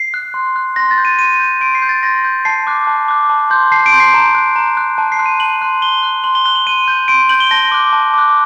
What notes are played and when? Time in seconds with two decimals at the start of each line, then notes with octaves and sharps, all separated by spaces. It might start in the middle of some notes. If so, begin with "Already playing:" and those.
Already playing: C7
0.14 F#6
0.34 C6
0.56 F#6
0.76 C6 A#6
0.91 A6
0.98 G6
1.05 D#7
1.19 C6 D#7
1.40 G6
1.61 C6 D7
1.75 C7
1.82 G6
1.89 A6
2.03 C6 A#6
2.24 G6
2.45 A5 C7
2.67 D6 F#6
2.87 A5
3.08 D6 F#6
3.30 A5
3.50 C6 G6
3.72 A5 C7
3.86 D7
3.92 C6 G6
4.00 C7
4.14 A#5
4.35 F#6
4.56 A#5
4.77 F#6
4.98 A5
5.12 C7
5.19 C6 F#6
5.26 D#7
5.40 A5 F#7
5.61 C6 F#6
5.82 C6 G7
6.03 F#6
6.24 C6 F#7
6.35 G7
6.46 F#6 G7
6.56 F#7
6.67 C6 D#7
6.88 G6
7.08 C6 D7
7.29 G6 F#7
7.40 G7
7.51 A5 A#6
7.72 D6 F#6
7.93 A5
8.14 D6 F#6